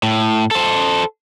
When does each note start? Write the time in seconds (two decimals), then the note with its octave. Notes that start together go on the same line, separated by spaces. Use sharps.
0.03 A2
0.51 A4 C5